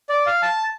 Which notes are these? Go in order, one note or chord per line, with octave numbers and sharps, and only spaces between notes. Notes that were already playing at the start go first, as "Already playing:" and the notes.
D5
F5
A5